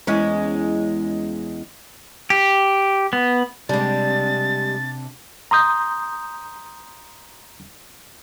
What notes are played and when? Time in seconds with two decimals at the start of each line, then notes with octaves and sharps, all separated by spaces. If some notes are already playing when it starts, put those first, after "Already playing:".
0.07 E2 G#3 C#4
2.30 G4
3.13 B3
3.69 C3 G3 G#3 D4 A6
5.51 A#5 C6 D#6 G6